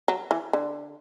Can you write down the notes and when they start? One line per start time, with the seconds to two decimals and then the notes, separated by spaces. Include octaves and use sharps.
0.08 F#3
0.31 E3
0.53 D3